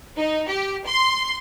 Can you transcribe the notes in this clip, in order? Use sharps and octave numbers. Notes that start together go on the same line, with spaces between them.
D#4
G4
C6